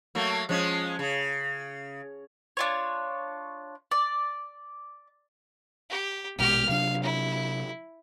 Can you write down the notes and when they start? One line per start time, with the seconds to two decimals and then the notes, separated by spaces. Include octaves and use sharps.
0.15 F#3 A3 A#3
0.49 F3 G#3 C#4
0.99 C#3
2.57 D4 F4 C#5
3.91 D5
5.90 G4
6.39 A#1 B2 G#3 G4 F6
6.69 C3 F#3 D4 F5
7.03 E4